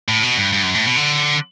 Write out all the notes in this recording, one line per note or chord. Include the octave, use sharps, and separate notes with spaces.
A2
B2
G2
G2
F#2
A2
B2
D3